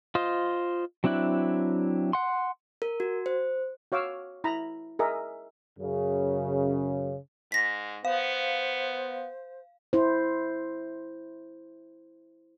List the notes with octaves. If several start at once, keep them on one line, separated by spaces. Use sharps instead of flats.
F4 C5 D#5
F#3 C4 D4 E4 F#6
F#5 C6
A#4
F#4
C5
F#4 C#5 F5 D6 E6
E4 A#5 B5
G#4 A#4 D#5 E5
F#2 C#3
G#2 A#6 B6
B3 C5 F5
E4 C5